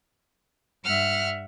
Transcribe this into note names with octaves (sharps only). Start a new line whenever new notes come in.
G2 E5 F#5 F6